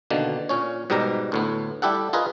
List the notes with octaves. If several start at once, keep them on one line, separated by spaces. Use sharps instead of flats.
B2 D3 D#3 A#3
A#2 C#4 C#5
G#2 B2 G3 G4 A#4 A#5
D2 A2 B3
G3 E4 G4 A4 F#5
F4 G#4 A#4 B4 D#5